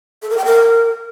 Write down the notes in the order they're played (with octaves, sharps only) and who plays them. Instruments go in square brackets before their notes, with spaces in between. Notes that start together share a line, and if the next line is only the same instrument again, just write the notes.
[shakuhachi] A4
A#4
G5
A#4